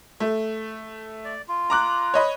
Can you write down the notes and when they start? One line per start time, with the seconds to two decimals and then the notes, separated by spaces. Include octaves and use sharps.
0.20 A3
1.24 D5
1.48 F4
1.70 A#5 D6 F#6
2.14 C#5 D#5 B5